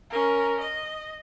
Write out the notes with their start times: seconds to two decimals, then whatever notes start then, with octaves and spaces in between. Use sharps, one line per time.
0.10 C#4 A#4
0.61 D#5